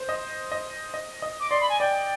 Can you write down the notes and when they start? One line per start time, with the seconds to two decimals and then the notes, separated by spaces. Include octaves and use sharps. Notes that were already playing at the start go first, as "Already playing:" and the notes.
Already playing: C5
0.09 D#5
0.52 D#5
0.94 D#5
1.22 D#5
1.40 D6
1.50 D5 C6
1.60 B5
1.69 G#5
1.80 D5 G5